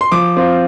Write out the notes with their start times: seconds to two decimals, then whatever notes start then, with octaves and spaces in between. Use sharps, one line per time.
0.01 C6
0.12 F3 D6
0.37 C4 F4